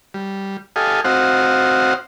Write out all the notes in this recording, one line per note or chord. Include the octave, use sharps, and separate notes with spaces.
G3
G4 A4 D#5 F5 G#5
C4 F#4 C5 D#5 F5 F#5